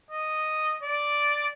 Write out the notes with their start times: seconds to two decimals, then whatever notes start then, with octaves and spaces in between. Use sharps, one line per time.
0.11 D#5
0.83 D5